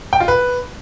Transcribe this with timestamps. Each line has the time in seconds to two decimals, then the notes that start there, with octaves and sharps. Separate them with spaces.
0.13 G5
0.20 F4
0.28 B4